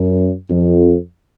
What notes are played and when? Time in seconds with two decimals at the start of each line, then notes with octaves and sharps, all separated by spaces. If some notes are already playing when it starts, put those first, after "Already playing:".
Already playing: F#2
0.50 F2